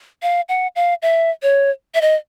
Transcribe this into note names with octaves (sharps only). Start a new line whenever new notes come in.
F5
F#5
F5
E5
C#5
E5
D#5